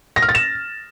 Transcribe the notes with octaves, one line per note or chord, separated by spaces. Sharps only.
A#6
F6
A6
E7